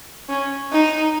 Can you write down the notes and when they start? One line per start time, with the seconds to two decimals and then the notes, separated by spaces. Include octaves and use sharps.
0.29 C#4
0.72 D#4